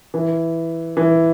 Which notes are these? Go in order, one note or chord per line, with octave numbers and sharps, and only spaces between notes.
E3
E3